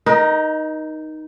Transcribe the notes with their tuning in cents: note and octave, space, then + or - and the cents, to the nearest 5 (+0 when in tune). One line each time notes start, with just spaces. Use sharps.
D#4 +0 A#4 +35